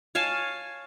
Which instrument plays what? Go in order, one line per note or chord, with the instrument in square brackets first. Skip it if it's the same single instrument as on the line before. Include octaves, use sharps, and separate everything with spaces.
[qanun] C#5 F5 G#5 A5